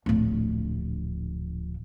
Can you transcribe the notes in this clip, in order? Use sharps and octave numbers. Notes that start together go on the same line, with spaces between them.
D1 A#1